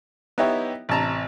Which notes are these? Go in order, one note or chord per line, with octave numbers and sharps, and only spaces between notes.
B3 D#4 E4 G4 C#5 E5
A1 C3 A5 A#5